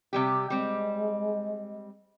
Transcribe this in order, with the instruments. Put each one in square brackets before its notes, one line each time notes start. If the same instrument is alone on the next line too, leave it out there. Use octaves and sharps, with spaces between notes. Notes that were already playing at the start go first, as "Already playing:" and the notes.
[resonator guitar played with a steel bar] C3 G3 G4
[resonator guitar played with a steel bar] G3 C4 [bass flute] G#3